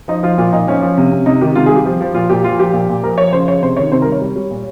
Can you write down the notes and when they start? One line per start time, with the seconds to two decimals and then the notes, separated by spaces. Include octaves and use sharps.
0.08 F3 D#4
0.23 F3 F4
0.38 A#2 F4
0.53 A#2 D#4
0.67 F3 C#4
0.82 F3
0.98 C3
1.11 C3
1.26 C3 D#4
1.41 D#3 G4
1.55 C3 F4
1.66 G3 G#4
1.76 G4
1.86 F3
2.01 F3
2.14 A#2 F4
2.30 A#2 G4
2.44 F3 F4
2.59 F3 G4
2.73 A#2
2.89 A#2
3.03 F3 A#4
3.18 F3 C#5
3.33 C#3 C5
3.48 C#3 C#5
3.62 C3 C5
3.77 D#3 C#5
3.92 C3 C5
4.02 G3 A#4
4.12 C#5
4.21 G3
4.36 G3
4.51 A#2